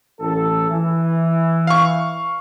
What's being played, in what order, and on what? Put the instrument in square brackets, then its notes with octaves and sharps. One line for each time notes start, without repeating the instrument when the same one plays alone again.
[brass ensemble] A1 A4
E3
[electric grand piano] F5 C#6